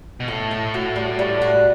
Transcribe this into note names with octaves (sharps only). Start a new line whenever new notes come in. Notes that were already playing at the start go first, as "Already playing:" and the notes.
B2
A2 A4
A4
F#4
G3
G3
F#4